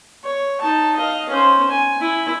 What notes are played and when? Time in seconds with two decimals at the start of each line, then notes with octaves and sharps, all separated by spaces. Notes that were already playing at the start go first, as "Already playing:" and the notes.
0.24 C#5
0.61 D#4 A5
0.96 D#5 F5
1.30 C#4 C5
1.70 G#5
2.01 E4